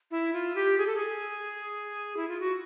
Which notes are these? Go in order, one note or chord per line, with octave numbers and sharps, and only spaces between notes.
E4
F4
G4
G#4
A4
G#4
E4
F4
F#4